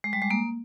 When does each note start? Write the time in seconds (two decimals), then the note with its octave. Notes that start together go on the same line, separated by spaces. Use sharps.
0.04 G#3
0.13 G3
0.22 G#3
0.31 A#3